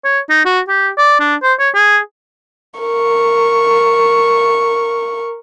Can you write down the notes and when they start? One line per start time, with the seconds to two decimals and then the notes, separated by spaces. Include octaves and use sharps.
0.05 C#5
0.30 D#4
0.45 F#4
0.68 G4
0.98 D5
1.20 D4
1.43 C5
1.59 C#5
1.75 G#4
2.80 A#4 C#6